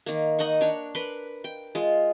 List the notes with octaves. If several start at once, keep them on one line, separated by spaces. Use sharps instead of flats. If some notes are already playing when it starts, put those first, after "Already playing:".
D#3 A#3
D#4 D#5 F#5 C#6
D4 C#5
A#4 B4 C6
G5
G#3 F4